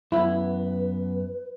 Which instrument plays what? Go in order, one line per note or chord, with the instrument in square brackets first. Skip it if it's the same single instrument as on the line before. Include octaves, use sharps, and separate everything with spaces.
[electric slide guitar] F#2 B3 [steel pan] E4 [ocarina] B4